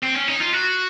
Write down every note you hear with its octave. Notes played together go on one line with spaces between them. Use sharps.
C4
C#4
D#4
F4
F#4